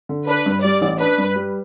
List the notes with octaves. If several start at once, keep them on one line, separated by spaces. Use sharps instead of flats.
D3
D4 B4
G2
G3 D5
A1
D4 B4
G2
G3